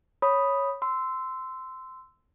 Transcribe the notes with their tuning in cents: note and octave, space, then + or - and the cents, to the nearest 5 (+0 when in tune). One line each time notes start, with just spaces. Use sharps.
C#5 +0 B5 +0 D#6 +0
C6 -15 E6 +0